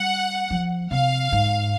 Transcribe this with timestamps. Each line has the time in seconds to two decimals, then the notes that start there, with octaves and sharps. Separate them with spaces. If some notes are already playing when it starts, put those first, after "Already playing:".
Already playing: G3 F#5
0.50 F3
0.91 C3 F5
1.32 G#2